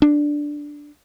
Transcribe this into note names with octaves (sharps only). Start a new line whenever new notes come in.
D4